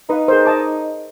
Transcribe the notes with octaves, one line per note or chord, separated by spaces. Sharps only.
D#4 B4 F5
G#4 A#4 C5
D#5 A5 D6